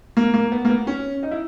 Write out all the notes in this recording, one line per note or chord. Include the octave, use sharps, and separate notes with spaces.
A#3
A#3
B3
A#3
B3
C#4
D#4
E4